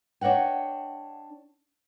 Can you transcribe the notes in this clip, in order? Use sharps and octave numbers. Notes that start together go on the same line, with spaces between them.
D4 C#5 D#5 F#5 G5